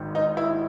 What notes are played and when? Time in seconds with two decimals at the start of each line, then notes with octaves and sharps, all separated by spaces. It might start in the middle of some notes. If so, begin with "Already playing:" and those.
Already playing: G#1 G#2 D#3
0.15 D#4
0.37 E4